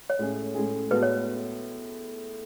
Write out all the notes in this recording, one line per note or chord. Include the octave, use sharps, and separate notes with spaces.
C#5
A2 G#3 C#4 G#4
A2 G#3 C#4 G#4
A2 G#3 B3 F#4 A4 B4
C#5